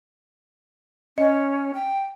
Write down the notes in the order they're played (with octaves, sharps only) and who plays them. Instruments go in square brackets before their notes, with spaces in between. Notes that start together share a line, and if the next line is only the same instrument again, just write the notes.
[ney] C#4 [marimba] D#5
[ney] G5